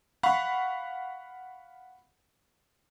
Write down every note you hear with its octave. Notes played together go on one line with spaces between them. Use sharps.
F5 F#5 B5 C#6